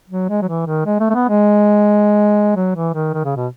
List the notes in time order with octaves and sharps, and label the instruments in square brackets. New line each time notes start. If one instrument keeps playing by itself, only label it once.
[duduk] F#3
G#3
F#3
E3
D#3
G#3
A3
A3
B3
G#3
F#3
E3
D#3
D#3
C#3
B2